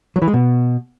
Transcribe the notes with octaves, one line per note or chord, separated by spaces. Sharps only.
F#3
E3
G#3
B2